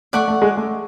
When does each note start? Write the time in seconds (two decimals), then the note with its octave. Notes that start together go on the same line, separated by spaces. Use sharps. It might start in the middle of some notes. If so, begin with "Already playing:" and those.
0.13 A3 D5 F#5 C#6
0.28 A3
0.42 G#3
0.57 A3